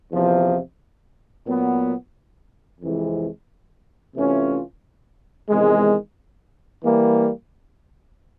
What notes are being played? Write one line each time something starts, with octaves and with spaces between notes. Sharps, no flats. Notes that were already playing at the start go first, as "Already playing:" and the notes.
E2 C3 F3
A#2 F#3 B3
F2 C3 E3 G#3
C3 E3 A3 C#4 F4
E2 C3 D#3 G#3
E3 G3 A#3